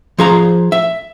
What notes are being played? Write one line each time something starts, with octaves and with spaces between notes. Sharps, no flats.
F3 G#4 A#5
E5